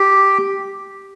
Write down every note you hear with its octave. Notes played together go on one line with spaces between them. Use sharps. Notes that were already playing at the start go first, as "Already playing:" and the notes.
Already playing: G4